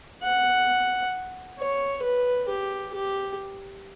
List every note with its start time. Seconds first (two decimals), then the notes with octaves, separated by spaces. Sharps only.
0.23 F#5
1.58 C#5
2.03 B4
2.49 G4
2.94 G4